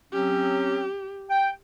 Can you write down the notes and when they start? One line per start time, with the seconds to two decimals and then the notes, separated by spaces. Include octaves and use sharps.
0.13 F#3 C4 C#4 G4
1.30 G5